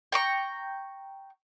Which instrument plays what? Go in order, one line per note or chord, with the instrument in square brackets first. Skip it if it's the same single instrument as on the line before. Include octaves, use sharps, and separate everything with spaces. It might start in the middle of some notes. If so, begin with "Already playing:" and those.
[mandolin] G5 A#5 C#6